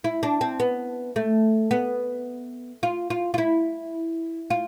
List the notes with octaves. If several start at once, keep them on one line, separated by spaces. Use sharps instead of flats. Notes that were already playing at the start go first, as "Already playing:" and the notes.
E4
D4
C4
B3
A3
B3
F4
F4
F4
E4
F4